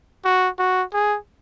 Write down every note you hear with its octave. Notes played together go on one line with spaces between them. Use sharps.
F#4
F#4
G#4